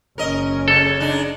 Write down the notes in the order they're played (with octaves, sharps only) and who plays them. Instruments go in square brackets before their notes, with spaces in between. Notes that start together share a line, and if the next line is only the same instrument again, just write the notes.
[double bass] F#1 C#4 [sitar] A#4 D#5
[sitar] C#3 [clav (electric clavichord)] A4
[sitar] C#3 D4 D#4